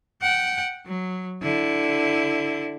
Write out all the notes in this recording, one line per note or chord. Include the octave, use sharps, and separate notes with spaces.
F#5 G5
F#3
D3 E4